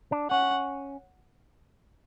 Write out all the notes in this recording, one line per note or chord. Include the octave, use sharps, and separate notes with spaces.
D4
C#4 F#5